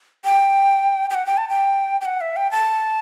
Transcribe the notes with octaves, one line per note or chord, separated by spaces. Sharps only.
G5
G5
F#5
G5
A5
G5
G5
F#5
E5
G5
A5